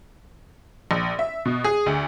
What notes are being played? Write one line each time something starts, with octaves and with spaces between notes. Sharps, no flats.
A#1
E5
B2
G#4
D2